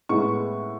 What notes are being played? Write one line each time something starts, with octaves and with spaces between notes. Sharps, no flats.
A2 G#3 B3 C#6